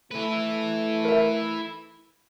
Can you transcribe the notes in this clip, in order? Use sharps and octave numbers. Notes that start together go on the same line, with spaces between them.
A3 E4 B4
A#4 E5